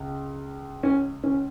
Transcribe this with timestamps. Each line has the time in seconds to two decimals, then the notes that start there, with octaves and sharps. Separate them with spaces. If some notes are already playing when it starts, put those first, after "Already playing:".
Already playing: C#2
0.83 C#4
1.24 C#4